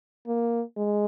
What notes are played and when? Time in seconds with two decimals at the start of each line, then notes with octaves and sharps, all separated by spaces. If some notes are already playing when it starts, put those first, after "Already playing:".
0.27 A#3
0.77 G#3